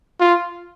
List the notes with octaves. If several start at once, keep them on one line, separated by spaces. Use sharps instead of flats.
F4